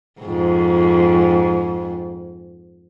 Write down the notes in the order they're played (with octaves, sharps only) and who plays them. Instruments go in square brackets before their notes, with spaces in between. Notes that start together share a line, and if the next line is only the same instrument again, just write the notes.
[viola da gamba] F2 G#2